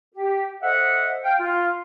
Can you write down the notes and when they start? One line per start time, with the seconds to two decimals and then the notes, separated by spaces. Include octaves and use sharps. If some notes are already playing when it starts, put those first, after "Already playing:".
0.15 G4
0.62 A4 C5 D#5 E5 F#5
1.24 F5 G5
1.40 F4